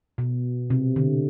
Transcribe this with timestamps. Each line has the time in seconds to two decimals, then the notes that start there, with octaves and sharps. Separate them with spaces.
0.18 B2
0.70 C3
0.96 D3